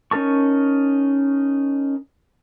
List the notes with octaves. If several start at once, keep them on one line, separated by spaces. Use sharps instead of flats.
C#4 D#4 A#4 A5 C#6